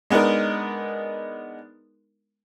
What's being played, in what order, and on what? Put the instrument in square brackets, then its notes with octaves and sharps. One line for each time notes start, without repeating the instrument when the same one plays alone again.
[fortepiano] G#3 B3 D4 D#4 A#4